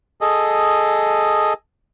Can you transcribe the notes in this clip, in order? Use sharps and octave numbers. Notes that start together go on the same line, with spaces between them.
G#4 A4 D#5